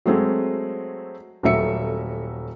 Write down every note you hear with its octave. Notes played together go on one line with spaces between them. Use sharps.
F#3 G#3 A3 C4
D#1 F#3 A3 E5 C#7